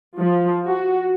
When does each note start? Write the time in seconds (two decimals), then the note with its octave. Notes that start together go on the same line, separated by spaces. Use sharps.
0.18 F3
0.67 F#4